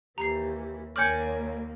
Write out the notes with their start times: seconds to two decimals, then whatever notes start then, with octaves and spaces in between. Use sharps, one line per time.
0.18 D#2 E3 G4 A#5 C7
0.96 D#2 A#3 C#5 D5 G#5 F6 G6 C#7